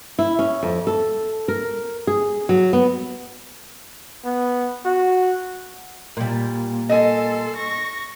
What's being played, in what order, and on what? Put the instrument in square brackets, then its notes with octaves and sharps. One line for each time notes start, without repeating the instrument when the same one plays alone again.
[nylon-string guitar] E4
C#4
F2
A4
A#4
G#4
F#3
B3
[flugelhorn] B3
F#4
[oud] A#2 G3
[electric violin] A4 C6 [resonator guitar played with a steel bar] D#5 G#5
[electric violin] C#6 A#6